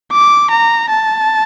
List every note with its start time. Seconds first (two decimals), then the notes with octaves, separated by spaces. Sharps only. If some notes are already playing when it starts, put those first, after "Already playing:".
0.13 D6
0.51 A#5
0.90 A5